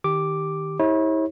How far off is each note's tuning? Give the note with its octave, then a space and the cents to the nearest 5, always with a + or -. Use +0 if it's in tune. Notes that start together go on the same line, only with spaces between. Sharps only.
D#3 +0 G4 +0 D6 +0
E4 -40 G4 +20 C#5 -35